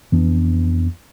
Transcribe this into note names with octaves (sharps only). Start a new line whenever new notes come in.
F2 E3 B3 D4